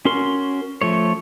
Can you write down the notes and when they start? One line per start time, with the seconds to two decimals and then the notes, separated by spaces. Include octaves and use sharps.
0.05 C#4 F#4 A#4 C6
0.81 F3 A3 C#5